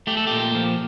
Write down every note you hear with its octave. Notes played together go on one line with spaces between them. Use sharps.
A3 G4
A4
A#2 G4
F3